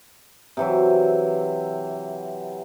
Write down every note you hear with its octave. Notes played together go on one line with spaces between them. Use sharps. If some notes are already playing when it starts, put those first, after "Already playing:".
C3 E3 F#3